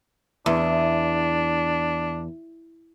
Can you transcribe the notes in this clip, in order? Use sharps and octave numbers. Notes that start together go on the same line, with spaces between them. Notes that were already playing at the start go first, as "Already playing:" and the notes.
E2 D4